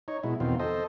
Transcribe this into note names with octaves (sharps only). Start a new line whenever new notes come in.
D#4 C#5
B2 G#3 E4
E2 B2 D#3 C4 F4
A4 C5 D#5